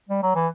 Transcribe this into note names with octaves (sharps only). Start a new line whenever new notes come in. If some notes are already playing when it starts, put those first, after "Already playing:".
G3
F#3
E3